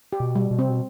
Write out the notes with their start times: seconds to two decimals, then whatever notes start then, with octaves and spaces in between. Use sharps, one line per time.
0.13 G4
0.20 B2
0.35 G3
0.51 B2
0.59 C3 C4
0.69 B2